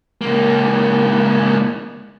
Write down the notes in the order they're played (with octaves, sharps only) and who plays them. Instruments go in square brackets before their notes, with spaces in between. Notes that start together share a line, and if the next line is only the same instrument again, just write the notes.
[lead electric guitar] C#2 A#3